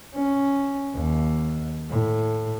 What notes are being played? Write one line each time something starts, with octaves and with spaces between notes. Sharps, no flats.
C#4
D#2
A2